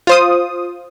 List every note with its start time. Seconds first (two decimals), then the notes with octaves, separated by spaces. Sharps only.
0.07 F4 C5 D#6